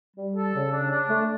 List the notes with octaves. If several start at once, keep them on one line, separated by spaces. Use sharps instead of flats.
G3
A4
C#3
D4
D4
A3